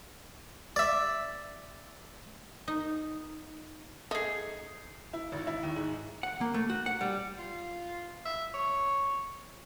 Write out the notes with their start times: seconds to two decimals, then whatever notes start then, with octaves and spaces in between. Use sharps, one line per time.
0.76 D5 E5
2.68 D#4
4.11 A3 D#4 G#4
5.13 E4
5.32 G#1
5.47 E4
5.63 D#2
5.76 G#2
6.23 F#5
6.41 A#3
6.54 A3
6.70 F#4
6.86 F#5
7.01 G3
7.38 F4
8.25 E5
8.54 C#5